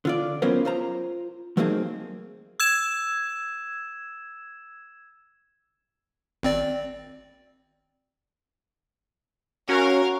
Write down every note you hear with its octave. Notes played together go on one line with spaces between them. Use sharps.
D3 F4 D5
F#3 B3 C#4 F4 A#4 C5
F4 C5 A#5
F#3 A3 A#3 C4 D#4 G#4
E6 G#6 E7
G#1 C4 D5
C#4 F#4 A#4 F5